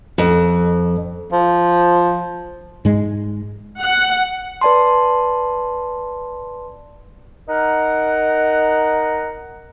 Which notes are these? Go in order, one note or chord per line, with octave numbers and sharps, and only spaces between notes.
F2
F3
G#2 G#3
F#5
B4 D5 A5 C6
D#4 A#4 F#5